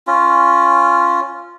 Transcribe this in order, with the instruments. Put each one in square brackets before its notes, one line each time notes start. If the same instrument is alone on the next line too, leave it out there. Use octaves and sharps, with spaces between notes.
[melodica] C#4 F4